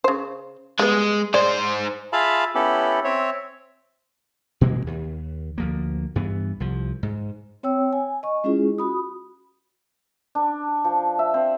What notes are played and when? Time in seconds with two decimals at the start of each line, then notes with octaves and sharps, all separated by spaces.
0.04 C#3 C5
0.79 G3 G#3 B3
1.34 G#2 G#4 C5 D5
2.13 F4 G#4 E5 F5 A5 B5
2.55 B3 C#4 E4 G4 A4
3.04 C4 C#5 E5
4.61 B2 E3 G#3 A#3
4.87 D#2
5.58 D2 F3 A#3
6.15 G2 E3 B3
6.60 C2 F3
7.03 G#2
7.63 C4 C#5 G5 E6
7.93 G#5
8.23 D#5 C#6
8.44 G#3 C#4 E4 F4 G#4
8.78 F#4 B5 D#6
10.35 D4
10.84 F3
11.19 E5
11.34 C4